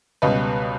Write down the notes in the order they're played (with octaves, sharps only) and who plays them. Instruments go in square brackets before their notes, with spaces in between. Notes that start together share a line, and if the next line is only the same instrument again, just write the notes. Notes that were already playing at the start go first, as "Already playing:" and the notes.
[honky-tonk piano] C#2 B2 G3 B4 D#5